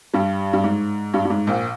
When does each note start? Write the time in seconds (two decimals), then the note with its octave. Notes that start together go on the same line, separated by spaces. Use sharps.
0.13 G2 G3
0.53 G2
0.64 G#2
1.14 G2
1.25 G2
1.30 G#2
1.47 A#1 A#2